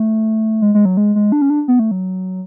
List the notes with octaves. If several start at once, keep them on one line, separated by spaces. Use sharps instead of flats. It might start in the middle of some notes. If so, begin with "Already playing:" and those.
Already playing: A3
G#3
G#3
F#3
G#3
G#3
D4
C#4
D4
B3
A3
F#3